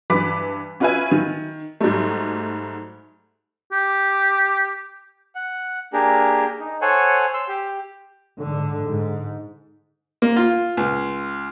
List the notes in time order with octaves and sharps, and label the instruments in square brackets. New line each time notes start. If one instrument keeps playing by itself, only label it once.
[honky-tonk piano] G2 E3 B4 B5 D6 B6
C#4 F4 F#4 B4 E5 G#5
D#3
G#2 F#3 G3 A3
[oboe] G4
[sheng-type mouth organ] F#5
A#3 D4 G4 G#4 A#4
D#4
A4 C5 C#5 F#5 G#5
C6 E6
G4
[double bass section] G#2 D3
G#2
[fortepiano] A#3
F4
C#2